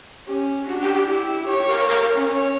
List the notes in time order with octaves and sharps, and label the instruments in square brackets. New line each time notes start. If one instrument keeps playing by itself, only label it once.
[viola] C#4 [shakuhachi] G4
[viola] D4 [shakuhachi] F#4
[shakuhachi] G4
G4
[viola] E4 [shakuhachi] G4
[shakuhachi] G4 [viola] C#5
[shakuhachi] A#4
A#4
A#4
C#4
[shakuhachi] C#4 [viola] C#5